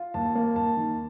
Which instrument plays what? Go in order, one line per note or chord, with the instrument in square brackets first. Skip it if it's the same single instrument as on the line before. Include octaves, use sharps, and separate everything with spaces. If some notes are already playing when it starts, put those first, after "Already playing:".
Already playing: [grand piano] F4
D#2 A5
A#3
D#2 A5
D#3